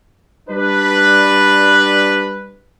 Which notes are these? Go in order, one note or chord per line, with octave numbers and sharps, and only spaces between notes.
G3 D4 B4